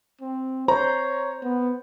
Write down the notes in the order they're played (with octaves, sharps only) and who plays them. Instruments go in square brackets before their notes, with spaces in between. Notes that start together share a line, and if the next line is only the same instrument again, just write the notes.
[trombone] C4
[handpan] C5 [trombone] C#5 [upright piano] A#5
[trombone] B3